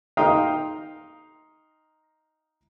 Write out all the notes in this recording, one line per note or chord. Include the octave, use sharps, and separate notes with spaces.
D#4 F5 G5 A#5 C6 D#6